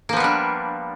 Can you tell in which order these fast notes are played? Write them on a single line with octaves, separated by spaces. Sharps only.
A#3 F3 B3 G3 D4